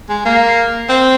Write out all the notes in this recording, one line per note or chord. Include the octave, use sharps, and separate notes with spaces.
G#3
A#3
C4